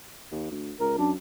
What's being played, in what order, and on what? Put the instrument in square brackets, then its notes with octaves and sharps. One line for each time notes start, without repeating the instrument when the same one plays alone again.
[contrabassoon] D#2
D2
[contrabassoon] C#2 [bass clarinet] A#4
[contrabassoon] F#2 [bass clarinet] D4